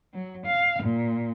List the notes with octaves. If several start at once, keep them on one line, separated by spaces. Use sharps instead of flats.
F#3
F5
A#2